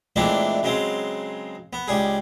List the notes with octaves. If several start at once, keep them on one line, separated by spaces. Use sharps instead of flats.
A#2 E3 G#3 A3 C4 D4
C#3 F#3 G#3 C4
B3
C#2 G3 G#4